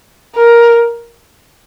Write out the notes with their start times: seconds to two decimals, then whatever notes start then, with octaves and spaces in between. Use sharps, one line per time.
0.36 A#4